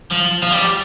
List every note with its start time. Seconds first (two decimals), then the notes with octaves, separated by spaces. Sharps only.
0.11 F3
0.42 F3
0.52 G3